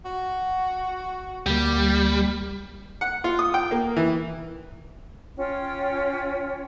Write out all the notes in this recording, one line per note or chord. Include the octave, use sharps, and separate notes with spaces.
F#4
D2 G3 A#3
F#5
F4
D#6
G5
A#3
E3
C#4 F4 C#5 G5